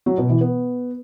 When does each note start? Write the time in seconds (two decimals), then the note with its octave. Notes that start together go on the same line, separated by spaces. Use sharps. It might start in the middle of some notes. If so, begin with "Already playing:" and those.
0.06 F#3
0.18 B2
0.29 E3
0.41 B3